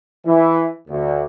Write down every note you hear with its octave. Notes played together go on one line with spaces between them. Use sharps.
E3
D2